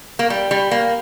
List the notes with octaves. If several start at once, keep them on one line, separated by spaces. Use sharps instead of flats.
A#3
G3
G3
A#3